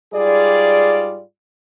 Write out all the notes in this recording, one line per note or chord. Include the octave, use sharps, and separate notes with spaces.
G#2 G3 F4 G#4 D5